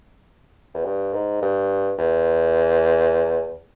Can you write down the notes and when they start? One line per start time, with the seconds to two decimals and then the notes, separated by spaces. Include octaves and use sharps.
0.74 E2
0.84 G2
1.13 G#2
1.42 G2
1.98 E2